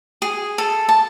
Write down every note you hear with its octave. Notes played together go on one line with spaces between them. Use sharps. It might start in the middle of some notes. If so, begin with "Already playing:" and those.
G#4
A4
A5